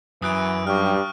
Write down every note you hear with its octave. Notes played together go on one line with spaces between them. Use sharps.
F#2 E3 D#6 F#6 D7
G2 G4 C#6 F6